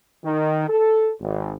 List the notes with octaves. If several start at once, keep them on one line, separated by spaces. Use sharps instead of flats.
D#3
A4
G#1